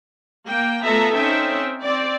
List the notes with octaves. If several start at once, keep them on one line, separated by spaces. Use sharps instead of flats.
A#3 G5
A3 B3 F4 A4 E5 A#5
C4 C#4 D#4 E5 G5
C4 D5